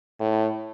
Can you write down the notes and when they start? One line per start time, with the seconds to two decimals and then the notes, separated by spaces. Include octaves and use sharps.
0.20 A2